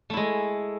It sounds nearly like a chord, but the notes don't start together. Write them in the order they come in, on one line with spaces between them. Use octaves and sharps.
A3 E4 G#3